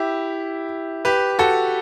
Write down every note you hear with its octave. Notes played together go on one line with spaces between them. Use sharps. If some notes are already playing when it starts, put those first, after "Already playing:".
Already playing: E4 G4
G4 B4
F#4 A4